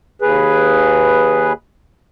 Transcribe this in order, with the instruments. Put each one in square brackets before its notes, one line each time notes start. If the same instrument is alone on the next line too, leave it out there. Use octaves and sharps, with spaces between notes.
[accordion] D#2 G#4 B4